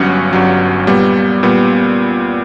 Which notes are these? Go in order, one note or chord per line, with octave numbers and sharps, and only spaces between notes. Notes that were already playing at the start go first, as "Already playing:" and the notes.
Already playing: G1 G2 F#3 C#4 F#5
G1 G2 F#3 C#4
A#2 G3 B3
A#2 G3 B3